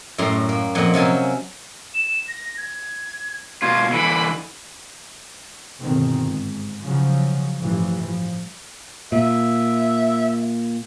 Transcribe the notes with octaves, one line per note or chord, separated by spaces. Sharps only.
F#2 A2 G3 A#5 C6
A#3
F2 A#2 D#5 F#5
C3 F#3 C#4 G#5
E7
A#6
G#6
B2 F4 G#6
D3 E3 B5
G1 B2 D#3 C4
G#2
C#3 F3 F#3
A1 G2 E3 F3
F3
A#2 E5